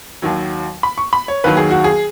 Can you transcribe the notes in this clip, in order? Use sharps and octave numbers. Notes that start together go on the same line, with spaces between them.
D#2 D#3 F#3
B5
C#6
B5
C#5
D#2 D#3 F#3 B4
G#4
F#4
G#4